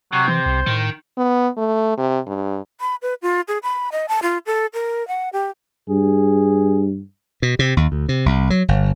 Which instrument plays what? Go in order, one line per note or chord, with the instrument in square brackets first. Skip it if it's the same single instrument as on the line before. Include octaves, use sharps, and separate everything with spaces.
[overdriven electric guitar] C3 [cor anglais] F#3
[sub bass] E3 [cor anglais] C5
[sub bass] C2
[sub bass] A2 [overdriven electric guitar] D#3
[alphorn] B3
A3
C3
G2
[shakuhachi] B5
B4
F4
G#4
B5
D#5
A5
F4
A4
A#4
F#5
G4
[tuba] G2 [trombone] G#4
[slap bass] B2
C3
D#2
D2
C3
C2
F#3
G1